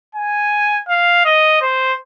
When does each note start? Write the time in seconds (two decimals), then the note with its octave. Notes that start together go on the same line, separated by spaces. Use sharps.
0.15 G#5
0.88 F5
1.25 D#5
1.62 C5